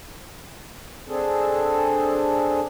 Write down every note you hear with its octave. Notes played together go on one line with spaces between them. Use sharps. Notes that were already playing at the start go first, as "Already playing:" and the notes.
C4 D4 G#4 A4